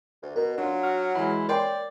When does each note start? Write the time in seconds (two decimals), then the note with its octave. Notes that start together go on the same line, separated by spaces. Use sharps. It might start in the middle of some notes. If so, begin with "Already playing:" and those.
0.23 D2
0.36 B2 A#4
0.58 F#3 D4 F4
0.83 F#4 F6
1.15 E3 G#3 E4
1.49 A#4 C#5 D5 G5 C6